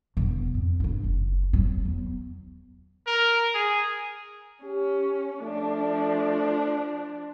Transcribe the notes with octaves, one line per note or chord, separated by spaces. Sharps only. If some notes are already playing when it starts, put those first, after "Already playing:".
E1 F#3
F2
G2 D4
F#1
F#2 F#3
E2
A#4
G#4
C#4 G4
F3 A3 D4